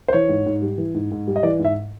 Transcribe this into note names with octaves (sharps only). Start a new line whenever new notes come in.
C5
E3 C#5
G#2
G#2
G3
E3
G#2
G#2
G3
D#5
E3 D5
G#2
E5